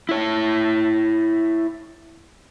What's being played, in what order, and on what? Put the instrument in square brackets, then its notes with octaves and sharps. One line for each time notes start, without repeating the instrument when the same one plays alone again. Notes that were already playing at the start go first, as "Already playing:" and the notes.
[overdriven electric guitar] E4 C#5